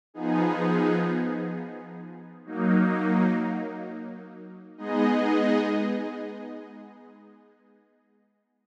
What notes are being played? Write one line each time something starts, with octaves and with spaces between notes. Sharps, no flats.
F3 B3 D#4 G#4
F#3 A#3 D#4
G#3 B3 D#4 G#4 D#5